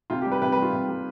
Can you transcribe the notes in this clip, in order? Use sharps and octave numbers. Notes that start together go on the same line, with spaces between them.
C3 F4
G4
G3
B4
C3 B4
B4
G3 F4
C3
G3